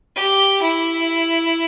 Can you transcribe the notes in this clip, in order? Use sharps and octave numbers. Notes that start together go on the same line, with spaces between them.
G4
E4